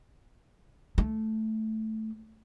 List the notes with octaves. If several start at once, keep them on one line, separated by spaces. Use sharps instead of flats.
A3